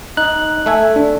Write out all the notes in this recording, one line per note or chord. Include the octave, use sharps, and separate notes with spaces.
D#4 F#6
A3 E5 G#5
D4